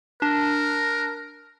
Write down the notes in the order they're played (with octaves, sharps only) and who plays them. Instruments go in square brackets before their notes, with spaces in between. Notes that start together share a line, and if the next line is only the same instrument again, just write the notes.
[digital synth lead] D4 [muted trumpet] A#4